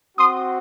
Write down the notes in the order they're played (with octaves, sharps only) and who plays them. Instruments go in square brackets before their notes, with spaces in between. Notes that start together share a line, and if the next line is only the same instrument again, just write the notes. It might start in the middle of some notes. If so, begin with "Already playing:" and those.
[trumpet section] C4 F#4 C6 D#6